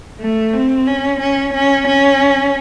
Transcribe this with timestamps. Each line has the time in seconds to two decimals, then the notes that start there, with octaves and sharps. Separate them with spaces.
0.20 A3
0.53 C4
0.87 C#4
1.21 C#4
1.54 C#4
1.87 C#4